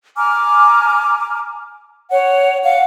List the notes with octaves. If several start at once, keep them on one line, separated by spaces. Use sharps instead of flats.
G#5 A#5 D6 F6
C#5 F#5
F5 F#5